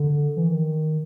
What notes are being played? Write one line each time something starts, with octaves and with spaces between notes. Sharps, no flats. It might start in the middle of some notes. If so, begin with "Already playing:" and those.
Already playing: D3
E3
D#3